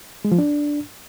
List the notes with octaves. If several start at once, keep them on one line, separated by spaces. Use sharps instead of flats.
G#3
F3
D4